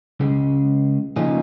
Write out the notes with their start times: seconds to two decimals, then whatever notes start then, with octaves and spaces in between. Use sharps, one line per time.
0.20 C#2 C#3 G#3
1.16 C#3 F3 A#3 D#4 G#4